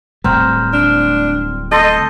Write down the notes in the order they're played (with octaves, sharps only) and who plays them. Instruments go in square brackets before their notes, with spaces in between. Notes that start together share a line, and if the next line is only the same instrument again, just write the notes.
[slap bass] D1 A2 G3 [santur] C4 [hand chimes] A#5 F6 G6
[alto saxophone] D4 [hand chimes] F6
[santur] A4 C6 [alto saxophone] D#5 [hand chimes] G6 A#6